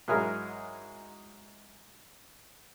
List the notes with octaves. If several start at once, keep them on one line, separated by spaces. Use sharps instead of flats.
G#2 F#3 E4 G#4 A#4 B5